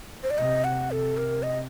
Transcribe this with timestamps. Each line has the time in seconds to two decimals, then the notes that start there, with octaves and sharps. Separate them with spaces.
0.23 C5
0.30 D5
0.38 C3 D#5
0.64 F#5
0.90 C3 A4
1.17 A#4
1.43 D#5